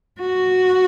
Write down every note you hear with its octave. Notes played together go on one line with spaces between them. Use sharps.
F#4